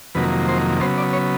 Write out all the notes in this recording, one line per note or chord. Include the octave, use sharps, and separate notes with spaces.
F2 C3 D#3 F#3 A#3 B4
C5
C#3 F#3 B3 C5
D5
C#5